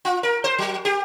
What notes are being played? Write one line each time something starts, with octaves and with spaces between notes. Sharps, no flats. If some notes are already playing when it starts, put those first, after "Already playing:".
F4
A#4
C5
F#3
G4